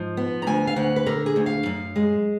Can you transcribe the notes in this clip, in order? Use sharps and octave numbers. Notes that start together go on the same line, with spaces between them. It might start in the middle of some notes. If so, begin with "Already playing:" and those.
Already playing: G#2 F3
B3
A#5
D2 G#5
F5
D2 F#5
B4
D3 A#4
G#4
D2
F5
F#2
G#3